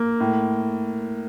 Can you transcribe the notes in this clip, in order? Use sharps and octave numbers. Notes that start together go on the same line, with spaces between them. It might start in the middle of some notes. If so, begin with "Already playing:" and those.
Already playing: A#3
A2